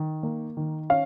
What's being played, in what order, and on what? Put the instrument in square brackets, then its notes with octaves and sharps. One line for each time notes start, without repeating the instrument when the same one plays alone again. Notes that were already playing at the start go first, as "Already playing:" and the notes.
Already playing: [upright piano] D#3
A#3
D#3
C#4 F5